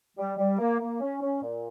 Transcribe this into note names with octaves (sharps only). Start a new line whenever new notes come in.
G3
G3
A#3
A#3
C#4
C#4
A#2